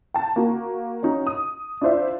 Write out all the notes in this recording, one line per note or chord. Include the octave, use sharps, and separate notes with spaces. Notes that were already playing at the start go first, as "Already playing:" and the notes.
G5 A5
A#3 F#4
C#4 D#4 F#4
D#6
D4 E4 F4 C5 D5 E5